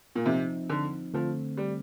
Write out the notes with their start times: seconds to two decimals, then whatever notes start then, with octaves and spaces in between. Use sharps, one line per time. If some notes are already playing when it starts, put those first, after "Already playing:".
0.16 A#2
0.26 C3 F3 C4 D#4
0.70 D3
1.14 D3 F3 A3 C4
1.57 G3